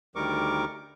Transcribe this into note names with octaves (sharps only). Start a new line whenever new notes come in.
D2 D#3 G3 A#4 C#6 D6